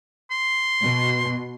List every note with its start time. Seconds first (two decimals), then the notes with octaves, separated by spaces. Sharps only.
0.31 C6
0.81 B2